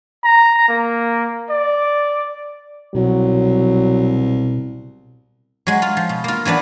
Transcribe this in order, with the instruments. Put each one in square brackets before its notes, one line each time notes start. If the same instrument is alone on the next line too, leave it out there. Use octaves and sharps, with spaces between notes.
[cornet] A#5
A#3
D5
[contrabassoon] C2 [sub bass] B2 [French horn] F#3
[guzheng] F#3 G#3
F4
F3
B2
A#3 F4
E3 F#3 B3 D4